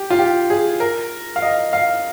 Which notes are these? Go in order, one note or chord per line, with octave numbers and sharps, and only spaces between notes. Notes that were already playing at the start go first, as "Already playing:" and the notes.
Already playing: G4
F4
G4
G#4
A#4
F5
D#5
F5